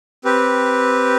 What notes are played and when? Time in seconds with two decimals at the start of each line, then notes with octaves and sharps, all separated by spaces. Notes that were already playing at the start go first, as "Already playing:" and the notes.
0.25 C4 G4 B4